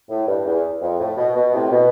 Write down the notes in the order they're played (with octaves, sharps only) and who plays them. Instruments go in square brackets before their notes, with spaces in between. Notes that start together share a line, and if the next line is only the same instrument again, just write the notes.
[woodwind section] A2
G2
E2
F2
A2
B2
B2
A2 C3
B2